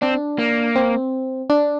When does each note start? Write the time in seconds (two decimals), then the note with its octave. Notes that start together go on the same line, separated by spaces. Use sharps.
0.02 C4 D4
0.38 A#3
0.76 C4
1.50 D4